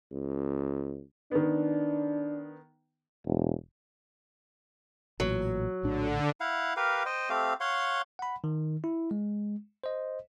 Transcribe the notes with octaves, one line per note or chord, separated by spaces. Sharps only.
C#2
D#3 B3 D4
E1
A1 A#2 F#3
A#1 A2 D3 D4
E4 F5 F#5
G4 A#4 B4 F5
C5 D#5 G5
A3 C4 G4 F5
C#5 F5 F#5 C6
F#5 B5
D#3
E4
G#3
C5 D#5